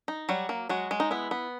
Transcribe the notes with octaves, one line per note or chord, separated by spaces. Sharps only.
D#4
F#3 G3 F#4
A#3
F#3 G#3 F#4
G#3
D#4
B3 E4
B3